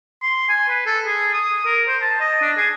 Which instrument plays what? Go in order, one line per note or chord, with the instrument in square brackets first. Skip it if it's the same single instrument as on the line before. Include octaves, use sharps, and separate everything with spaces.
[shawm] C6
G#5
B4
A4
G#4
D#6
A#4
C5
A5
D#5
D4
G#4